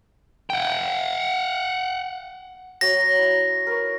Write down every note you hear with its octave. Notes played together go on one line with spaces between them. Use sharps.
F#5 G5
F#3 C#5 A#5 A#6
E4
A#4 B4 C#5